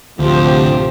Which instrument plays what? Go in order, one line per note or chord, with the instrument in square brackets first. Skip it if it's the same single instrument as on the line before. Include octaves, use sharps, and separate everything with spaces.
[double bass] A1 C3 [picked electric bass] D2 [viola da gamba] F3 G4 C5